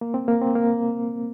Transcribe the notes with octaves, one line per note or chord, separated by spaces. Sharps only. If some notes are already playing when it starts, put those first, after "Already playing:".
A#3
C4
A#3
C4
A#3